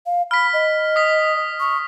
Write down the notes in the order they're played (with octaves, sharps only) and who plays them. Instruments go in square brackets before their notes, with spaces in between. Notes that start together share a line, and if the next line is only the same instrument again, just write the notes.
[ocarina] F5
[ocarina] B5 [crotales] F6 B6
[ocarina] D#5
[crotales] D#6 B6
[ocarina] C#6